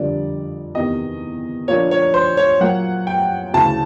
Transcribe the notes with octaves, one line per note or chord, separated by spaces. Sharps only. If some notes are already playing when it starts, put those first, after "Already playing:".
Already playing: F2 D3 G3 A#3 D4 D5
E2 C3 D#3 D#5
A#2 F3 A#3 D4 C#5
C#5
C5
C#5
A#2 F#3 A#3 F#5
G5
D2 C#3 E3 A5